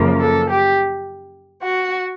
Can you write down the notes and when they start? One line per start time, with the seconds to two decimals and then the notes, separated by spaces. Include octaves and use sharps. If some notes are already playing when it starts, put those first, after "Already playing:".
Already playing: F#2 C#3 F3 A#3
0.20 A4
0.49 G4
1.62 F#4